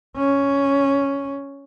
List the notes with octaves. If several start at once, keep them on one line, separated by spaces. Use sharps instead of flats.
C#4